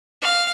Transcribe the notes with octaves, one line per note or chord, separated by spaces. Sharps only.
F5